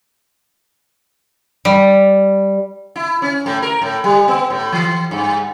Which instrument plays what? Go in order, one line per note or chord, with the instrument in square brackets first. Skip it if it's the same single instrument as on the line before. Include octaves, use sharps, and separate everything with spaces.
[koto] G3
[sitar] E4
C#4
A2
A#4
A2
G3
B3
A2
E3
G2